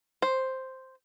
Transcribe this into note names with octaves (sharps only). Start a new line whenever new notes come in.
C5